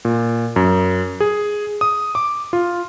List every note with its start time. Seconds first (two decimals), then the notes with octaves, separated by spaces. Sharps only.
0.05 A#2
0.56 F#2
1.20 G#4
1.81 D#6
2.15 D6
2.53 F4